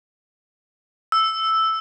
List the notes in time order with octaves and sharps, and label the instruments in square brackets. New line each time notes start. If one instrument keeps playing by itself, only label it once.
[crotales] E6